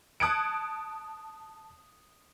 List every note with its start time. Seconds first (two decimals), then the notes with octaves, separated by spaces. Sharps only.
0.20 A5 D#6 F#6 G#6 C#7 D7